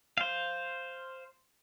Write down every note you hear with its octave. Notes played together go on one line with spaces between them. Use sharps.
C5 F5